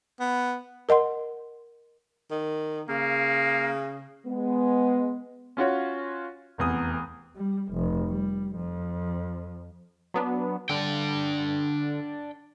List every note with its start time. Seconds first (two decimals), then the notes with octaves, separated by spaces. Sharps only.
0.20 B3
0.89 A#4 D#5 F#5 C6
2.31 D#3
2.89 C#3 A#3
4.26 G#3 B3
5.57 C#4 F4 F#4 C#5
6.58 F1 E2 D#6
7.37 G3
7.73 F1
8.09 G3
8.56 F2
10.14 F#3 B3 D4
10.69 D3 D4 G5